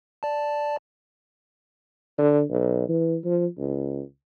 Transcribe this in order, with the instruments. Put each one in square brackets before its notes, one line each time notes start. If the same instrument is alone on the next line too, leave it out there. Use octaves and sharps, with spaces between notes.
[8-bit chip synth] D5 A5
[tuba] D3
B1
E3
F3
C#2